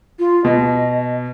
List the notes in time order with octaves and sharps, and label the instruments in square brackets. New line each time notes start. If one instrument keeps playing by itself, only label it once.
[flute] F4
[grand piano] B2 [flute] D#5